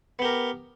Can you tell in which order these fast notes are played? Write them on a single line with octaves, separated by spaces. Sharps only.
B3 G4 A#4